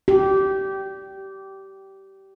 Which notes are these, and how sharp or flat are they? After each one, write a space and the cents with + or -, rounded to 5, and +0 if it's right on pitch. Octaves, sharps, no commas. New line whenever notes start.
G4 -20